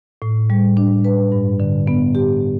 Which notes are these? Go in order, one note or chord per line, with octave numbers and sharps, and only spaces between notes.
A2
G3
D4
B4
G2
D3
B3
G4